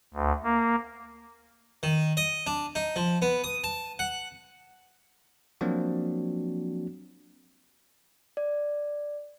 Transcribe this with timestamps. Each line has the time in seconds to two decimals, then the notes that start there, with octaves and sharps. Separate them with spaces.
0.14 D2
0.44 A#3
1.83 D#3
2.17 D#5
2.47 D4
2.75 D#4
2.96 F3
3.22 B3
3.44 D#6
3.64 A5
3.99 F#5
5.61 F3 F#3 A#3 C4 D4 F#4
8.37 D5